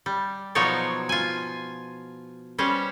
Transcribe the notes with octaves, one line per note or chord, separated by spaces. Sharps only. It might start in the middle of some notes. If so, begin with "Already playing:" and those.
G3
B2 F3 F#3 D#4 C#5 D5
F4 G#5
G3 C#4 B4 C5